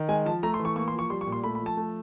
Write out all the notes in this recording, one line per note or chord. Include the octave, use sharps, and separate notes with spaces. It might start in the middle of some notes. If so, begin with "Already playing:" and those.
Already playing: D#3
G#3 G#5
F3 A5
A3 A#5
C6
E3
C#6
A#3 C#6
C6
F3
C#6
G3 C6
C#6
A#2
C6
A3 B5
B5
F3
A5
A3